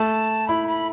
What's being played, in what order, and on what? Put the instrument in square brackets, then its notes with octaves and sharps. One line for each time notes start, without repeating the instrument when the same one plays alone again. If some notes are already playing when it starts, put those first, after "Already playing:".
Already playing: [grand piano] A3 [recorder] A5
[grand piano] E4 [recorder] B5
[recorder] B5